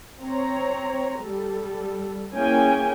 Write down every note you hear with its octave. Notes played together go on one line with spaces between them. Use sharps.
C4 C#5 A#5
G3 A4
A#3 C#4 E4 G#4 G5 G#5